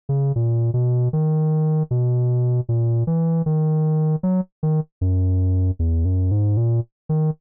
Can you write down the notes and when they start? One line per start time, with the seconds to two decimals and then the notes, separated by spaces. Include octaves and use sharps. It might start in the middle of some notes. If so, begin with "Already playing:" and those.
0.09 C#3
0.36 A#2
0.74 B2
1.13 D#3
1.91 B2
2.69 A#2
3.07 E3
3.46 D#3
4.23 F#3
4.63 D#3
5.01 F#2
5.79 E2
6.05 F#2
6.31 G#2
6.57 A#2
7.09 D#3